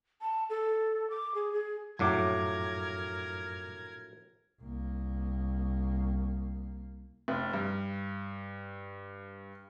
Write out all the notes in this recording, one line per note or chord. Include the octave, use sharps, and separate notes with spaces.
A5
A4
D6
G#4
G#4
A#1 F#2 A2 F#3 A#4 D6 G#6
C2 A#3
F1
G2